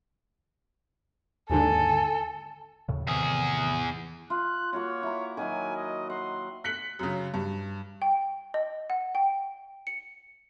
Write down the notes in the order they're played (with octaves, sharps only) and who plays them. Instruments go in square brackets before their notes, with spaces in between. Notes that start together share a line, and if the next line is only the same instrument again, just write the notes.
[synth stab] D#2 G#2 D3 [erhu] A4 [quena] G#5
[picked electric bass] D#2 A2 C#3
[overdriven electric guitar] E2 G#4 [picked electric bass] A2 C3 D#3
[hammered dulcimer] F4 [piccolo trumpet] F#6
[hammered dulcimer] A#3 F4 F#4 [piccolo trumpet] C#5
[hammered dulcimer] E4 A#5
[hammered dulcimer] D#3 F#3 E4 [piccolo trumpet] G#5
[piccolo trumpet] D#5
[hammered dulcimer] F#5 [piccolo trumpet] C6
[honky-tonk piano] F#6 B6 C#7 F#7
F#2 C#3
G2
[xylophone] G5
D#5
F#5
G5
C#7